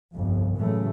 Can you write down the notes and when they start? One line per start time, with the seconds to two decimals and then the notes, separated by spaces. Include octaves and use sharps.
0.14 G1 C2 F2
0.57 A2 C#3 E3 F#3 G#3 A3